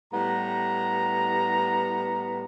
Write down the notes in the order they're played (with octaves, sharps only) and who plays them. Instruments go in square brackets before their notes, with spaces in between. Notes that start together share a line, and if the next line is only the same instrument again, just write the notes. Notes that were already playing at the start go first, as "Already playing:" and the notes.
[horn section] A2 G3 B3 A#5